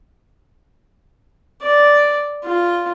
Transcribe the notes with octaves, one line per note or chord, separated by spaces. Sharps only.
D5
F4